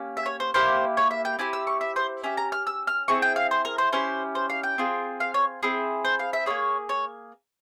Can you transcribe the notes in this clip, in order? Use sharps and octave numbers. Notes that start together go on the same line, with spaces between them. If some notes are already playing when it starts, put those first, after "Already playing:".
Already playing: A#3 C#4 G4
E5
C#5
C5
A#3 E4 G4 C5
C#5
E5
G5
C4 E4 G4 G#5
E6
C#6
E5
C5
C#4 G4 E5
A#5
F6
E6
F6
C4 E4 G#4 C#6
G5
F5
C5
A#4
C5
C#4 E4 G4 C5
C5
F5
G5
C4 F4 G#4
F5
C#5
C4 E4 G#4
C5
F5
E5
A#3 F4 G#4 C#5
C#5